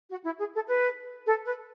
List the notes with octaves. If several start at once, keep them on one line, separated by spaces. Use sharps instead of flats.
F#4
E4
G#4
A4
B4
A4
B4